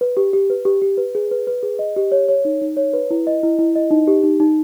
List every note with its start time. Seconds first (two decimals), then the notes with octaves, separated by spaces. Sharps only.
0.01 B4
0.17 G4
0.33 G4
0.50 B4
0.65 G4
0.82 G4
0.98 B4
1.15 G#4
1.31 B4
1.47 B4
1.63 G#4
1.79 D#5
1.96 G4
2.12 C#5
2.28 C#5
2.45 D#4
2.62 D#4
2.77 C#5
2.93 B4
3.10 E4
3.27 D#5
3.43 E4
3.59 E4
3.76 D#5
3.91 D#4
4.07 G4
4.23 D#4
4.40 D#4